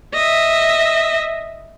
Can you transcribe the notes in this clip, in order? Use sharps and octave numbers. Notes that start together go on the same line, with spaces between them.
D#5 E5